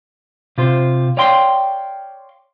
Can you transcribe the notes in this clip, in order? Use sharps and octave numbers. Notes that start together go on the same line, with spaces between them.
C3 F4 C5
C#5 D5 F5 G5 C6